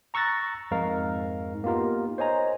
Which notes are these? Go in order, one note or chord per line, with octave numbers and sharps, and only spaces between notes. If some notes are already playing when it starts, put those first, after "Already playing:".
A#5 C#6 E6 F#6 A6 A#6
F2 G#2 D#4 A#4 F5
A#3 B3 D#4 F4 G4 A#4
C5 C#5 D#5 G#5 A#5